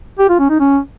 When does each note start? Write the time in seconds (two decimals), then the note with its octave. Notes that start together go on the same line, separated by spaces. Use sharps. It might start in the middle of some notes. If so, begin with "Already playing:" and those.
0.19 G4
0.29 F4
0.39 C#4
0.50 D#4
0.60 C#4